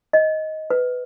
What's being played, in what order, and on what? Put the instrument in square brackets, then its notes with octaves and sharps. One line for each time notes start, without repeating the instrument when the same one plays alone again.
[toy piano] D#5
B4